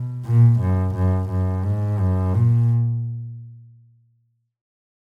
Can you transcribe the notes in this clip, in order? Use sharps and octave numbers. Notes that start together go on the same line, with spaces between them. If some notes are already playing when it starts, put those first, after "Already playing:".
Already playing: B2
A#2
F#2
F#2
F#2
G#2
F#2
A#2